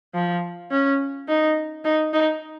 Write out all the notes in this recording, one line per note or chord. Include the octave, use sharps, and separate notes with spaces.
F3
C#4
D#4
D#4
D#4